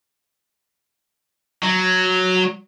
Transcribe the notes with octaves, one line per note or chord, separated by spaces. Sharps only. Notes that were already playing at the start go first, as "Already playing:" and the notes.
F#3